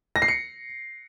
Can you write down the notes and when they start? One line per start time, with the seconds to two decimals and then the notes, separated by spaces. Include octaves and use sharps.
0.16 A#6
0.22 C7
0.28 C#7